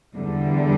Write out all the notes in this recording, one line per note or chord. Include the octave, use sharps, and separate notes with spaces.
E2 D3 G3